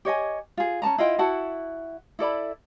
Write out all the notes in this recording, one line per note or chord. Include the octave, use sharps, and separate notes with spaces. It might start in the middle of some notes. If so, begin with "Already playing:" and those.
G4 C#5 D#5 G#5
F4 G#4
C#4 D4 A5 A#5
E4 F4 D#5 G5
E4 F#4 F#5 A5
E4 A4 D5 B5